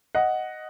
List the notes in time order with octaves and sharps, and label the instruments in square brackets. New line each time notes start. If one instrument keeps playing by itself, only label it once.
[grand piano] D#5 F#5